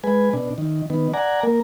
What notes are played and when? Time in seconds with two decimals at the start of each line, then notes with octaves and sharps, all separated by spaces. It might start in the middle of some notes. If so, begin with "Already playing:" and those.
0.04 G#3 B4 G#5
0.33 B2 D4
0.58 D#3
0.90 D#3 B3
1.14 D5 F#5 G#5 A#5
1.43 A#3 A#4